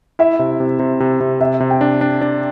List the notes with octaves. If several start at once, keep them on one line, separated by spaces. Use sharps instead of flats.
E4 E5
C3
C3
C3
C3
C3
C3 E5
C3
G5
D4
D4
D4